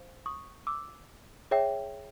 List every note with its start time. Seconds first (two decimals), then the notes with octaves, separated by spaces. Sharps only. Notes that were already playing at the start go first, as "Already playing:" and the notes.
Already playing: C5 F5
0.26 C#6 D#6
0.67 D6 E6
1.51 G#4 C#5 E5 G5